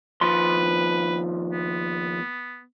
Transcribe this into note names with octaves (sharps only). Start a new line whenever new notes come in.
D#2 F3 B4 C6
B3